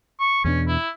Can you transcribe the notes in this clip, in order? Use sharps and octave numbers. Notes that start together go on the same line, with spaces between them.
C#6
E2 B2 C#4 D4
E4